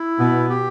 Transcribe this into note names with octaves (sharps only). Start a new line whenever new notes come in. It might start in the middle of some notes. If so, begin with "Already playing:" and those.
Already playing: E4
B2 B3
G4